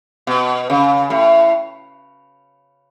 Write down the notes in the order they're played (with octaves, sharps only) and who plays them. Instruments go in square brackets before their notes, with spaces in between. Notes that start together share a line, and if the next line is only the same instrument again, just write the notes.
[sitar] B2
C#3
A2